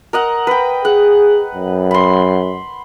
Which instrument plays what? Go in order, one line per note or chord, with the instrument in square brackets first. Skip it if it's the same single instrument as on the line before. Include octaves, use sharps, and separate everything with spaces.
[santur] A#4 D#5 F#5
B4 G5
[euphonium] G#4 [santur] F#5
[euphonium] F#2
[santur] B5 C6